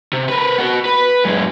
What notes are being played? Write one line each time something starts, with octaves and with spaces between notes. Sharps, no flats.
C3
A#4 B4
B3 F#4
B4
F#2 G#3